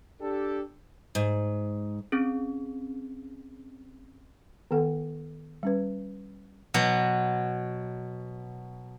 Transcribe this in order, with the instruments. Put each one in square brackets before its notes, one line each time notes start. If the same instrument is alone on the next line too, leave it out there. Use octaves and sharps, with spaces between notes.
[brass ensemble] D4 G4 A4
[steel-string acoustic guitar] G#2
[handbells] C4 C#4 G#4
[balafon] D#3 B3 A4 F#5
G3 C#4 B4
[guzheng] B2 F#3